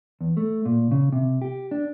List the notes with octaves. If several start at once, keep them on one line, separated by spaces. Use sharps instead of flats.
E2
A3
A#2
C#3
C3
G4
D4